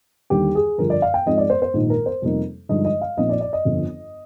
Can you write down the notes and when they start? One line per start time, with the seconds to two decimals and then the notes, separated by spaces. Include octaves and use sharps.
0.30 D#2 D3 G3 G4
0.55 G#4
0.78 G2 D3 F3 A#4
0.90 D5
1.02 F5
1.14 G5
1.26 G#2 F3 G#3 C4 D#5
1.38 D5
1.50 C5
1.62 C5
1.73 A#1 G#2 D#3 G#3 D#4
1.90 A#4
2.06 C5
2.22 F2 C3 G3 A#3 D#4
2.69 G2 D3 F3 G#3 D#4 D#5
2.85 D#5
3.01 F5
3.17 A#1 A#2 F3 C4 D#4 D#5
3.29 D5
3.41 D5
3.53 D#5
3.65 G1 F2 D3